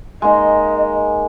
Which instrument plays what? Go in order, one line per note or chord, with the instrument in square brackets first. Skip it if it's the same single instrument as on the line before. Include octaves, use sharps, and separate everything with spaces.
[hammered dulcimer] G#3 A#3 D#4 [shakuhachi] D#5